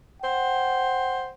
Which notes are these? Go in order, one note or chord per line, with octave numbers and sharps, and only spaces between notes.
C5 F#5 G5